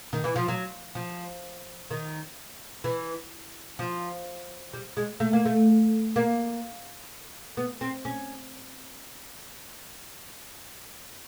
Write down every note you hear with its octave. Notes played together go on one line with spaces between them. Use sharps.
D#3
E3
F3
F#3
F3
D#3
E3
F3
G3
G#3
A3
A#3
A3
A#3
B3
C4
C#4